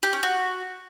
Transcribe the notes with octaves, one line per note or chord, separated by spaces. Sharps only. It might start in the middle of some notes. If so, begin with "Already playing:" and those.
G4
C#4
F#4